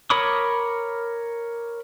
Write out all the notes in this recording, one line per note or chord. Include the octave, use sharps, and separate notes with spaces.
A#4 C#5 B5 D6 D#6